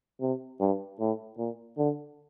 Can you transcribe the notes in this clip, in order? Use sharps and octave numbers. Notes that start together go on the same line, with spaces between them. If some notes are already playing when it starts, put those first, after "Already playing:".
C3
G2
A2
A#2
D3